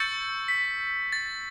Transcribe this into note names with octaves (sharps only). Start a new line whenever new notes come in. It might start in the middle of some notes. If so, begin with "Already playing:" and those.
Already playing: C#6 E6 G6 A6 C#7
B6
A6